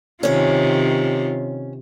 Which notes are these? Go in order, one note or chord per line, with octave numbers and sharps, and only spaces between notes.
C3 D#3 C#4 F4 C#5